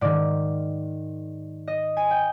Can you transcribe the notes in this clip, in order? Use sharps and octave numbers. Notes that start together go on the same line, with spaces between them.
G#2 D#3 D5
D#5
G#5
G5